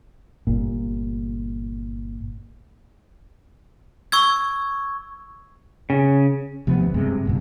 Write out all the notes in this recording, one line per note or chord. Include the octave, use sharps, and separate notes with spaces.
G1 A#2
C#6 E6 G#6
C#3
D2 C3 F3 B3
G2 C3 G#3
C#2 G2 B2